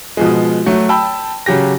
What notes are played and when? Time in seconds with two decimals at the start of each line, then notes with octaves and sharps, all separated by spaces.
0.17 B2 F3 G#3
0.66 F#3 A3
0.89 G5 A5 B5 E6
1.46 C#3 F#3 G4 A#6